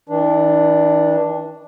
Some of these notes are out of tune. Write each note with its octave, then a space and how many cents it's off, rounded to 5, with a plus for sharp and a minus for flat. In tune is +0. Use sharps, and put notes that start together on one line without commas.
E3 -45 D4 +0